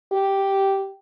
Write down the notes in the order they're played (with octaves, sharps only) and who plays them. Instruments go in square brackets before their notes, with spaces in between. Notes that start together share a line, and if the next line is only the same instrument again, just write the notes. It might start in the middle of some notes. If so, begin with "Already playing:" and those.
[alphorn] G4